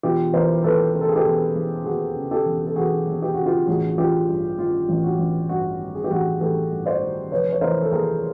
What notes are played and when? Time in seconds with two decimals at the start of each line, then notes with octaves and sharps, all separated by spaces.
0.03 E1 F4 G4
0.33 E3 A#4 C5
0.64 D#2 A4 B4
0.94 C#3 A#4
1.01 A4
1.09 G#4
1.16 G4 A4
1.24 E1
1.55 E3
1.85 D#2 F#4 G#4
2.15 C#3
2.31 G4 A4
2.45 E1
2.67 A4
2.76 E3 F#4 G#4
3.06 D#2
3.22 G4
3.34 C#3 F#4
3.46 F4 G4
3.68 A1 F#4 G#4
3.89 F#4
3.98 A1 F4 G4
4.29 G2
4.58 D#3 F4
4.89 A1
5.03 F#4
5.18 A1
5.49 G2 F#4
5.79 D#3
5.95 G#4
6.04 G4
6.11 A1 F#4 G#4
6.40 A1 G4 A4
6.71 G2
6.86 C5 D5
7.01 D#3
7.31 F1 B4 C#5
7.52 C#5
7.61 E3 A#4 C5
7.82 A4
7.92 D#2 G#4 A#4